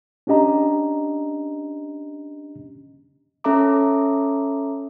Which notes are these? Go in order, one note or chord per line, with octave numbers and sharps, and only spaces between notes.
C#4 D4 G4 D#5 A#5
C#4 A4 E5 A#5 D6